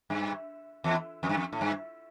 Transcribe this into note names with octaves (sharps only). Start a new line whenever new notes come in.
G2
E2
F2
G2
F2
A2
G2